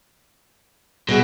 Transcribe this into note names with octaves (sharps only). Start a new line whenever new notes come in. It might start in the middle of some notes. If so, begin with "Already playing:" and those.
B2 G3 G#4